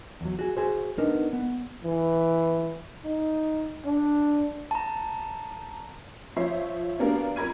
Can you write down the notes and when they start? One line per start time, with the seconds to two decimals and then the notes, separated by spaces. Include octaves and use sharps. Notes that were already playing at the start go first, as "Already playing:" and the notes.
0.21 E2 F#3
0.39 F#4 G#4
0.57 F#4 G#4 C5
0.98 B3 D4 D#4 A#4
1.33 B3
1.84 E3
3.04 D#4
3.85 D4
4.71 A5 A#5
6.36 F3 C5 C#5 E5 C7
6.99 F#3 A#3 B3 D4 G4 A#4
7.36 F2 A#4 B5 G#6 D#7